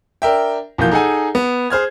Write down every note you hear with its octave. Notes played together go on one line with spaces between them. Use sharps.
D4 A#4 E5 G5
A#1 B2 E3 A#3 F4 G6
D#4 G#4 A4 F#5 G#5
B3
G#4 C5 F6 G#6